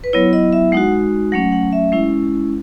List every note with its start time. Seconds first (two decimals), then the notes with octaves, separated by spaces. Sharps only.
0.04 B4
0.13 F#3 B3 E4 C#5
0.33 D#5
0.53 E5
0.72 G#3 D#4 F#4 F#5
1.32 F#3 A3 C#4 F#5
1.52 F#5
1.73 E5
1.92 G#3 C#4 E4